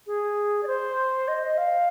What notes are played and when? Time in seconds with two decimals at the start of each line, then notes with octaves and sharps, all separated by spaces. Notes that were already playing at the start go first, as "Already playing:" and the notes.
0.07 G#4
0.63 D5
0.67 C5
1.28 D#5
1.43 D#5
1.58 F5